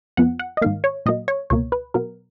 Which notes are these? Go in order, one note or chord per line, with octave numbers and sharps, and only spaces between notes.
F2 F3 B3 F#5
F#5
D#5
G#2 D#3 A#3 F5
C#5
A#2 F#3 A#3 D#5
C#5
C#2 B2 A#3 C#5
B4
B2 F#3 B3 A#4